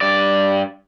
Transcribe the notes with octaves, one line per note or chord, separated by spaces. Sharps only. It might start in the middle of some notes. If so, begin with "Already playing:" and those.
G2 D5